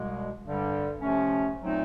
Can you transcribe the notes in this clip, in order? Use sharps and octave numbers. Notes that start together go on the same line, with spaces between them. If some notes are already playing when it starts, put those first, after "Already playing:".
Already playing: C2 B2 G#3
G2 D3 G3
C3 F3 A3 C#4
A#2 F#3 A3 C4 D#4